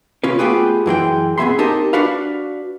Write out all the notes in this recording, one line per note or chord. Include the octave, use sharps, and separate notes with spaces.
C3 C#4 F4 B4
A3 B3 F4 G4 G#4 B4
F#2 E3 G#3 G5
B3 C4 G#4 E5 B5 C6
C4 D#4 G4 A#4 D#5 A5
D4 F#4 B4 F5